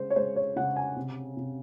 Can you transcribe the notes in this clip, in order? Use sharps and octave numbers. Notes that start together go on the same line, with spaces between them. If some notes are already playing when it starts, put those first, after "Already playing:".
Already playing: C#3 G#3 C5
C#5
G#3 C5
C#5
C#3 F#5
G#5
C3
C3